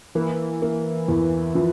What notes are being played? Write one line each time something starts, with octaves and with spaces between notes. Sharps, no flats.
E3 A#3
A#3
E2
F3